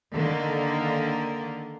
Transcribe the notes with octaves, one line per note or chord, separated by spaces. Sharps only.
D3 D#3 A#3